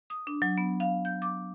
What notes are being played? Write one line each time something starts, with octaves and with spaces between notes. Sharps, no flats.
D#6
D4
F#3
B3
F5
G6
D6